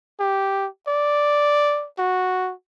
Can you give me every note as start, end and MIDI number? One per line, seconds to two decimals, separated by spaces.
0.20 0.67 67
0.88 1.87 74
1.99 2.52 66